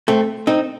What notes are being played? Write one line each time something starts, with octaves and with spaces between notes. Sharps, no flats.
A3 C4
C4 D#4